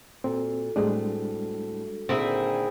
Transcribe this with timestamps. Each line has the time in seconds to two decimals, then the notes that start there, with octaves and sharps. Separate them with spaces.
0.24 A#2 C4 F#4 A4
0.76 A2 G3 G#3 C4 D4 G#4
2.09 A#2 D3 D#3 C4 E4 G#4